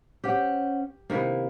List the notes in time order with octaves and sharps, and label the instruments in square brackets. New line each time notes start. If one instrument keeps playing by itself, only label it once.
[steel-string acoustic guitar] C#4 C5 F#5 [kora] G4
[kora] C3 D#3 E4 [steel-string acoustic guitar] A#3